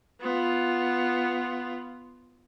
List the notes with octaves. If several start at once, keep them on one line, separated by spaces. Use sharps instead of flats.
B3 F4